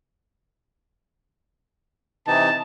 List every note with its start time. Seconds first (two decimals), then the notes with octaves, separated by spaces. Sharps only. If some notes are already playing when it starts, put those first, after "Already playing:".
2.28 C3 E3 D#4 A5